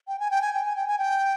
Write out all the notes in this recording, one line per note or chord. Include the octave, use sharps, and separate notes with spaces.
G5
G#5
G5
G#5
G5
G#5
G5
G#5
G5